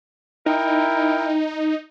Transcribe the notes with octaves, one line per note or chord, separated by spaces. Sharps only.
D#4 E4 A#4 G5